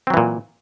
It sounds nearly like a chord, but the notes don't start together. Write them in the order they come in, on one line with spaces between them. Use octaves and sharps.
C4 F#3 E3 A#2